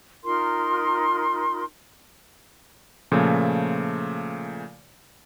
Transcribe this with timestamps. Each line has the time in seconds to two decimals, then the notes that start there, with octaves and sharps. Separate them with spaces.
0.24 D#4 F4 A#4 C6
3.12 A#2 C#3 F3 A3